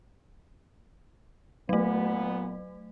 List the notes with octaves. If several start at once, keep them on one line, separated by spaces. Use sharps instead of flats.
A#2 F#3 A3 B3